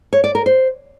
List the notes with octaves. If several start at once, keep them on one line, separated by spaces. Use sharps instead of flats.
C#5
D5
A#4
C5